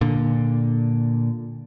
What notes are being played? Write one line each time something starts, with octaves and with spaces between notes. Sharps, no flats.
A#2 D3